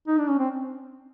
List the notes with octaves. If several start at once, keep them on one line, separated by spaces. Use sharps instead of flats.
D#4
D4
C#4
C4